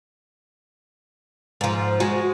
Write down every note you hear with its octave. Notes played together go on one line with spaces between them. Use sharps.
G#2 F3
G#3 F#4